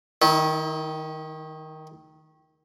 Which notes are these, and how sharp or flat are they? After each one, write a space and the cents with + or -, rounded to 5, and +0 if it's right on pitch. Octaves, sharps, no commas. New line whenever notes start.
D#3 +5 E4 -40